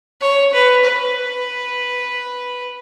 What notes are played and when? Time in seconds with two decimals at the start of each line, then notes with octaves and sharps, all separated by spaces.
0.21 C#5
0.53 B4
0.85 B4